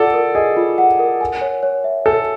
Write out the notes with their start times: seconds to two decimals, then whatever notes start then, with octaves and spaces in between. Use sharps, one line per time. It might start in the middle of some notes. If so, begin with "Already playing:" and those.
Already playing: F4 A4 D5 F#5
0.14 A#4
0.35 G#4 D#5
0.57 F4
0.78 F#5
0.99 A#4
1.21 G#5
1.41 C#5
1.63 C#5
1.84 E5
2.06 A4 G#5